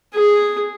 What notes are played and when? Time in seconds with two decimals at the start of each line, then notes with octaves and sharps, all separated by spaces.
0.14 G#4